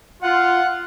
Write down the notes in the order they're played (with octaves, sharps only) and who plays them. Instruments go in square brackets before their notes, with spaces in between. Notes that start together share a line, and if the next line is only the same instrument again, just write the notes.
[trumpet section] F4 [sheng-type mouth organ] F#5